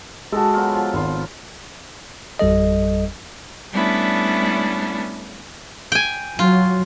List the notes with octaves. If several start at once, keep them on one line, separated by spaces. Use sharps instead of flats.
G#3 F#4 A4
F#3 B3 F4
F3
G#1 C6
G#1 F2 G3 A4 D#5
G3 A3 B3 C#4 D4 E4
G5 G#5
F#3 F4